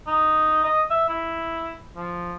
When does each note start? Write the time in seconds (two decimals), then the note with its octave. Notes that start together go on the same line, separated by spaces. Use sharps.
0.07 D#4
0.64 D#5
0.90 E5
1.09 E4
1.96 F3